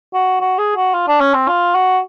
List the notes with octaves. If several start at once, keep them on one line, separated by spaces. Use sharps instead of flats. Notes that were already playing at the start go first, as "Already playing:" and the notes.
F#4
F#4
G#4
F#4
F4
D4
C#4
C4
F4
F#4